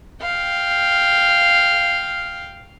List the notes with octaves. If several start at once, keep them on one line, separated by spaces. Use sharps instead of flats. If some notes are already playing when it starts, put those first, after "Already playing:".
F5 G5